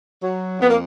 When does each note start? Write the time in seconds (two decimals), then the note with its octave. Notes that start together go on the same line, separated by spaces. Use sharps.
0.22 F#3
0.58 F2 B3
0.69 A#3